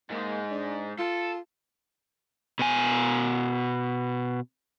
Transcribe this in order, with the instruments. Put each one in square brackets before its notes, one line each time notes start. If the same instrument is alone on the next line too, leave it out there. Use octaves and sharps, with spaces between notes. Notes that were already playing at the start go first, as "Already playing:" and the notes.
[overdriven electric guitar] G#2 G#3 [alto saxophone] A#3
[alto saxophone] D4
[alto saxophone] F4 [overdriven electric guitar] A4
[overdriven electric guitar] B2 G#5